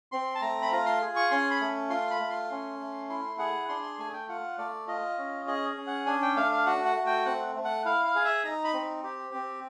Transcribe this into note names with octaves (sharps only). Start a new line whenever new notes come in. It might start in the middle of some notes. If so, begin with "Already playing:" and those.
C4 C6
A5
A3 A#5
B5
F4 A#5
C6
G#4
C#6
C#4 C6
B5
A3
F4 C6
B5
A3
C6
C#4
A3
E4 C6
G#4 F#5
D4 C6
C6
A3 G#5
G5
F4 F#5
A3 D5
F4 D#5
C#4
G#4 D#5
C#4
F#5
D4 G#5
G5
A3 F5
F5
F#4 F#5
F#5
A3
G5
C4 F#5
A3
F#5
E4 F5
F5
G#4
E5
D#4 A#5
B5
C4
G4
C4